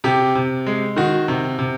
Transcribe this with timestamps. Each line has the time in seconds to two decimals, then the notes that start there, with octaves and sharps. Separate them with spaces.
0.04 C3 G4
0.35 C3
0.66 G#3
0.96 D#3 F#4
1.28 C3
1.59 C3